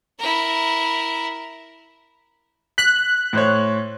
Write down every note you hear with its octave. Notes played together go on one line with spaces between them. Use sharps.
E4 A#4
F#6 B6
A2 C5 C#5